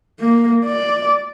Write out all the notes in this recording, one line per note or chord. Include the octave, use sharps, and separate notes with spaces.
A#3
D5